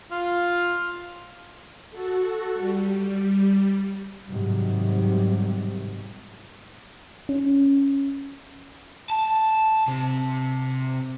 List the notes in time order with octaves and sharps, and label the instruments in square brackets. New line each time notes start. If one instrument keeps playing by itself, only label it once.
[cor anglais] F4
[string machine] F#4 A4
G3
[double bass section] G#2 C3 D#3 F#3 G3
[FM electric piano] C#4
[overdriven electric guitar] A5
C3